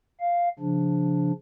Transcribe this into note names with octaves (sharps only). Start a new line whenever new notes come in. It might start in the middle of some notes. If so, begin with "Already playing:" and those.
F5
C#3 F3 D4